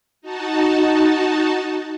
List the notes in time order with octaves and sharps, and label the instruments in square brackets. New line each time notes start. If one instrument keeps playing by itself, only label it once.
[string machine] D#4 F#4 A5